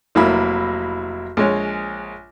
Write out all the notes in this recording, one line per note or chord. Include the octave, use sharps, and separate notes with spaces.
F1 F#3 A#3 E4 B5
A#1 G#3 C#5